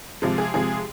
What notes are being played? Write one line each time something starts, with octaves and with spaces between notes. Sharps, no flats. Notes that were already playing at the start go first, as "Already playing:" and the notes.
C3 F3 G#3
G#4
C3 F3 G#3 G#4